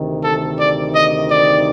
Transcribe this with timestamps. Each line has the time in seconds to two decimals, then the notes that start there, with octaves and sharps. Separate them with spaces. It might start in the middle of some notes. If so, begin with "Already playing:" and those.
Already playing: D2 C3 D#3
0.24 A4
0.59 D5
0.95 D#5
1.31 D5